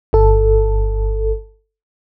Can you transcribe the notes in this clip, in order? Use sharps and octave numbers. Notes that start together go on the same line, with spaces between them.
G1 A4